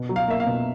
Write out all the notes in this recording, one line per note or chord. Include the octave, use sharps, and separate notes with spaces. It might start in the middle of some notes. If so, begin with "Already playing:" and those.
Already playing: B2
F#3
F5
A#3 E5
F5
B2